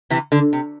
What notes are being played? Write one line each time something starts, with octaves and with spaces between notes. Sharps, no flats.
C3 E3
D3
C3